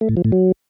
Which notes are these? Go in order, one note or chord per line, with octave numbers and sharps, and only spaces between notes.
A3
A2
F3
A2
F#3